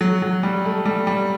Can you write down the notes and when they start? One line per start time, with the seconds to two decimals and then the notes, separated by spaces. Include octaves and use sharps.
0.01 F#3
0.22 F#3
0.43 G3
0.65 A3
0.85 G3
1.07 G3